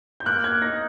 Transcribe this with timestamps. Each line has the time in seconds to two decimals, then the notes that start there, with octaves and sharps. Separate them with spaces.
0.20 G6
0.26 A#3 F#6
0.44 G#6
0.61 D#4 A#6